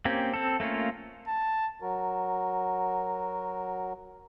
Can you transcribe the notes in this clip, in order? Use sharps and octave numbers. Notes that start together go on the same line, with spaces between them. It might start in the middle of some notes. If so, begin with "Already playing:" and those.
A#3 C4 C#4 G4
C4 A4
A3 A#3 C#4 F4
A5
F#3 F#4 A#4